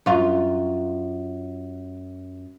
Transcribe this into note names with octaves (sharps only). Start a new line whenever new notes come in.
F#2 F4